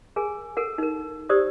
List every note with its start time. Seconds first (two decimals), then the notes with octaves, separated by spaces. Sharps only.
0.16 G#4 A#4 G#5
0.57 A4 A#4 F#5
0.78 D#4 A#4
1.29 G4 C5 D5 D#6 E6